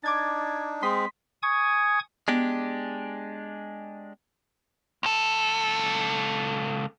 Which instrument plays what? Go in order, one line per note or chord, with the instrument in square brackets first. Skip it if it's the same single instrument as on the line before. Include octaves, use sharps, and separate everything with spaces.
[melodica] D4 D#4 [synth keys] D6 G#6 A6
[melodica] G#3 C4 [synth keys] C6 D#6 B6
[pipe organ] G#5 C#6 D#6 G#6
[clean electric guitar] G#3 D4 G4 [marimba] B3
[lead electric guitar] C#2 A4